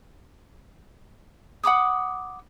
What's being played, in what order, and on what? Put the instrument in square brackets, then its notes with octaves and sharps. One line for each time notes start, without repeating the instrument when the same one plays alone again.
[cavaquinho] F#5 B5 D6 D#6